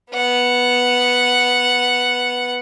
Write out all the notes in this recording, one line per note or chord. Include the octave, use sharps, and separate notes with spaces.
B3 F#5